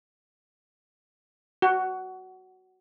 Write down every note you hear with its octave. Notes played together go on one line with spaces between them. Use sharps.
F#4